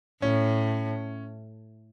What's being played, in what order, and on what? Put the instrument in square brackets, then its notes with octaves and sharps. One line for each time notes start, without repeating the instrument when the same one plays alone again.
[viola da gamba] A2 [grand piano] C#4